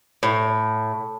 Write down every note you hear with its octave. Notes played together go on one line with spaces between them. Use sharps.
A2